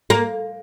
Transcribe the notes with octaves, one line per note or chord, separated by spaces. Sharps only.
A#3